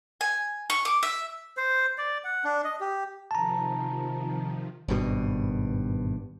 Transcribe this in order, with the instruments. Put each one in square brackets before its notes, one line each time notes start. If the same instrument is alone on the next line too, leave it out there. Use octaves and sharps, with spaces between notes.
[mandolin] G#5
C#6
D6
E5
[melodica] C5
D5
F#5
D4
D#5
G4
[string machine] C3 D#3 F3 [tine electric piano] A5 A#5
[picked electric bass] G#1 G2 B2